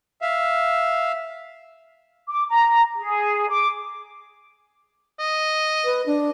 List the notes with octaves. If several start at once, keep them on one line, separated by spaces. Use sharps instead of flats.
E5 F5
D6
A#5
G#4
D6
D#5
B4
D4